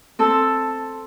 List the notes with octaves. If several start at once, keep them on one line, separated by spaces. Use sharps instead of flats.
C4 A4 A5 E6